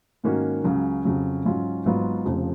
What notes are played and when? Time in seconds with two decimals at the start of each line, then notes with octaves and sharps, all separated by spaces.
0.24 G#2 D#3 A#3 C#4 F#4
0.64 C#2 C#3 F#3 C#4
1.05 F2 C#3 F#3
1.45 G#2 F#3 C#4 F4
1.85 G#1 G#2 F#3 B3 F4
2.25 F1 F2 C#3 F3